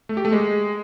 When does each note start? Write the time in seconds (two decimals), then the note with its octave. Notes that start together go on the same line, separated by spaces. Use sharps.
0.09 A3
0.17 G4
0.25 A3
0.32 G#3